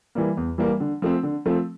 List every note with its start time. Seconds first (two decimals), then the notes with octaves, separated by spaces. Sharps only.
0.15 E3 G3 A#3
0.37 E2
0.58 E3 G3 A#3
0.80 D3
1.02 F3 A3 C4
1.23 D3
1.46 F3 A3 C4